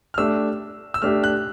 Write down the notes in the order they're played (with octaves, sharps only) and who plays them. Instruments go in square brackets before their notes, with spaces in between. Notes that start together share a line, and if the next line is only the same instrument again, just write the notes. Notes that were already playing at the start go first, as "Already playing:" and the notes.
[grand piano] F6
[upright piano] A3 D4 G4 [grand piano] E6
[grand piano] E6
[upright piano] A3 D4 G4 [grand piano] F6
[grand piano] F#6